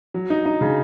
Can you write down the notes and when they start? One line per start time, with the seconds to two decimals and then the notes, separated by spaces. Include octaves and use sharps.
0.14 F#3
0.30 D#4
0.45 D#4
0.61 C#3